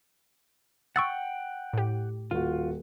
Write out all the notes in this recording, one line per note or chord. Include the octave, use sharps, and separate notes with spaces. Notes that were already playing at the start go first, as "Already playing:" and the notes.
F#5 G5 C#6 E6 A6
A2 G4
D#1 F4 F#4